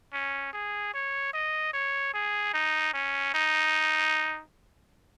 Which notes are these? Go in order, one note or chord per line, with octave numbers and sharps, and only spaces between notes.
C#4
G#4
C#5
D#5
C#5
G#4
D#4
C#4
D#4